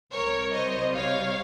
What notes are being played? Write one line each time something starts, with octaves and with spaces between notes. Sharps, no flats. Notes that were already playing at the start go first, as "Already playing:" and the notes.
C2 C3 G3 A#4 C#5
C5 D#5
C#5 F5